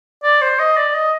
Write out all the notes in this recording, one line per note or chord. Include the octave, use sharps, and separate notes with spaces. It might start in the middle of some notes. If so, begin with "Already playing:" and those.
D5
C5
D#5
D5
D#5